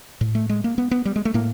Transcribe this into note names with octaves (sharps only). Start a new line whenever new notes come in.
A2
A3
G#3
A#3
B3
B3
G3
G#3
A3
A2 A#3